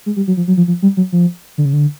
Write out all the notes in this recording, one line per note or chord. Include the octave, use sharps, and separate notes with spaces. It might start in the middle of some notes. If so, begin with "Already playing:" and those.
G#3
G3
F#3
F3
F#3
F3
F3
G3
F#3
F3
D3
C#3
D3